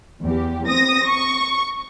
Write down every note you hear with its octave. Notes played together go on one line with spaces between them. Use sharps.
E2 G4
C4 D#6 A#6
C#6